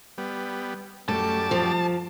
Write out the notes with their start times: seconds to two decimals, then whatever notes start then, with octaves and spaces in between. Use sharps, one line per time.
0.18 G3 B3
1.09 F#2 G3 A3 A5 D6
1.51 F3